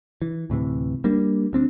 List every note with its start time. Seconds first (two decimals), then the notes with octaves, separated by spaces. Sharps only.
0.22 E3
0.50 D2 A2 C3 E3
1.04 G3 A#3 D4
1.53 D2 C4 D4